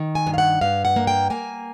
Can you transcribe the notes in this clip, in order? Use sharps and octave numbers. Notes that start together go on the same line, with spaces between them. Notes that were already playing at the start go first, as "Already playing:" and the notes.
Already playing: D#3
G#5
G2
F5
F#5
G2 F5
F#5
A#3
G5
A#3 G#5